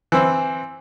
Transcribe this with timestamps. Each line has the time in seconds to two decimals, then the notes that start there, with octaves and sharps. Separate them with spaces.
0.12 E3 C4